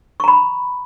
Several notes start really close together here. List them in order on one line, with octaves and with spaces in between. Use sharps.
C#6 A#5 B5